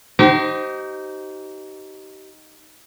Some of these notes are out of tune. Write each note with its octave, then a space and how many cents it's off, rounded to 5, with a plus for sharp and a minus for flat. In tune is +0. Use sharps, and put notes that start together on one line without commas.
D#4 +0 G4 -35 C5 +0